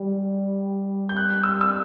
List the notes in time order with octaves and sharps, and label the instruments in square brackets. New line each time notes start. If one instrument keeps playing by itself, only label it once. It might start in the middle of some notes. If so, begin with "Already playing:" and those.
Already playing: [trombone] G3
[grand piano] G6
F#6
E6
E6